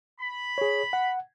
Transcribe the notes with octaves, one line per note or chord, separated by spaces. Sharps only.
B5
G#4 C#5
F#5